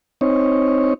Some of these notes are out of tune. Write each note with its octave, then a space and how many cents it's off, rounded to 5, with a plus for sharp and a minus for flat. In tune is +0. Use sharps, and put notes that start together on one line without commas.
C4 +0 D#4 +0 C#5 +0